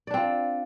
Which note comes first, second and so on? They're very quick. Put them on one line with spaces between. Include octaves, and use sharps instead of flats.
D5 D4 C4 F4